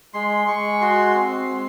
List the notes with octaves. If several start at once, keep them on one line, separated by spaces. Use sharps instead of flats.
G#3 C6
G#3 C#6
F#4 C6
C4
G#3